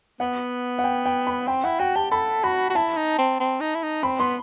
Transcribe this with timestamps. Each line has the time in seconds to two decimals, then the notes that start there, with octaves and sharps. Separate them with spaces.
0.20 B3 F#5
0.79 F#5
0.84 G5
1.06 G5
1.27 B5
1.48 C4 G5
1.64 E4 F#5
1.80 F#4 G5
1.96 G4 A5
2.12 A4 B5
2.43 F#4 B5
2.70 F#4
2.75 E4 A5
2.97 D#4
3.18 C4
3.40 C4
3.60 D#4
3.75 E4
3.83 D#4
4.03 C4 B5
4.19 B3 C6